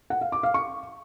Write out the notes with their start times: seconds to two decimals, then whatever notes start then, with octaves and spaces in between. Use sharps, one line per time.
0.10 F#5
0.21 F5
0.32 D6
0.43 F5
0.54 C#6